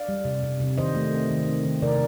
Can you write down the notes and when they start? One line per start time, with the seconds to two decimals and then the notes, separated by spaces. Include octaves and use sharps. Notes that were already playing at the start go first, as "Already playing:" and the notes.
Already playing: D5 F5
0.09 G3
0.25 C3
0.43 C3
0.60 C3
0.78 D#3 C5 D#5
0.96 A3
1.13 C4
1.30 D#3
1.48 C4
1.65 D#3
1.82 C3 A#4 D5